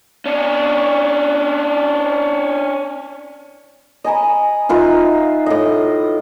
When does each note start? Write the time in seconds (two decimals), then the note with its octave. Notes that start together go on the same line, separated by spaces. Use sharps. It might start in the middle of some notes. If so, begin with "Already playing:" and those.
0.26 C#4 D4
4.04 D#5 G#5 A#5 B5
4.69 D#4 F4 B4 E5
5.46 A2 D#5